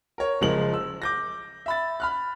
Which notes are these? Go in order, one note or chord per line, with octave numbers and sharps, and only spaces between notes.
A#4 C#5
F#1 F3 G#3 A#4 F#7
E6
D6 G6 A#6
E5 B5 A6
B5 F6 F#6